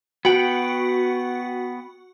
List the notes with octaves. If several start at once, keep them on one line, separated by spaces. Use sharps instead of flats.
B3 F#4 G5